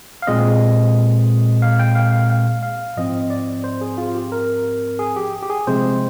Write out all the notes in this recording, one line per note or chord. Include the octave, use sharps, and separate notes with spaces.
F5
A#2 G#3 C4 D#5
F5
G5
F5
F5
F5
F5
G#2 F3 C4 D#5
D#5
D5
C5
G#4
F4
G4
A#4
G#4
G4
G4
G#4
C3 F3 G#3 C4 C5